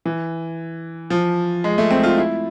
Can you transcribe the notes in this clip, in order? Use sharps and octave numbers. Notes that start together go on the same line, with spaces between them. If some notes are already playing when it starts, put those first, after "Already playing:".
E3
F3
G#3
A3
C4
F4
E4